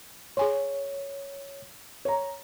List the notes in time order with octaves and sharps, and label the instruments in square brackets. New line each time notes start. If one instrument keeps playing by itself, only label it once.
[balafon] G#4 G#5 C6 [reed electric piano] C#5
[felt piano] C#5 A#5